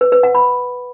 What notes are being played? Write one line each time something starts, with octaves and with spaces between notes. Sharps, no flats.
B4
B4
F#5
B5